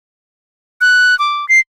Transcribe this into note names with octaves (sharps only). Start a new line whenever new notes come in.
F#6
D6
C7